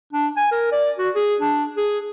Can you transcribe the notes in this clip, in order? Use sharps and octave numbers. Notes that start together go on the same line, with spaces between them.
D4
G#5
A#4
D5
F#4
G#4
D4
G#4